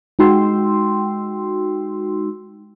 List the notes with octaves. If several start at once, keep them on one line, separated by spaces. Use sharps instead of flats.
G#3 D#4 F#4 G5 C6 E6